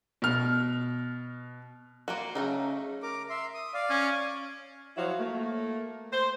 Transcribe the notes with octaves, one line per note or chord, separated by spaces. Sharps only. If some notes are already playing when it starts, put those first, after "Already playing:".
B2 F6
A#3 F4 F#4
C#3 F#3 A3 D#4
A#4 D6
E5 C6
D#6
D5 F5
C#4
F3 F#3 E4 F#4 C#5 F5
A3 A#3
C5